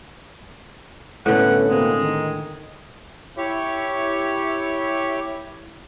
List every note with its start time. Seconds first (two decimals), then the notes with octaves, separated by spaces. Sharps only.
1.26 A2 D3 B3 C#4 B4 F#5
1.70 B2 G#3 A#3 C4
2.01 D#3
3.38 E4 G4 C#5